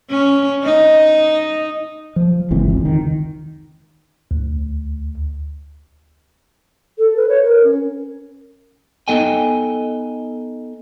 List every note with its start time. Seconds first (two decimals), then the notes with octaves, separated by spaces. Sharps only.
0.10 C#4
0.64 D#4
2.16 F3
2.51 G1 C#2 E3 C4
2.73 F1 C#2
2.85 D#3
4.31 D2
6.98 A4
7.17 B4
7.29 C#5
7.43 A#4
7.64 C#4
9.08 B3 D#4 A4 D#5 G5 G#5